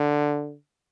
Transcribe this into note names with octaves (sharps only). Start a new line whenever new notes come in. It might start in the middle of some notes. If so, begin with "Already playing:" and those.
Already playing: D3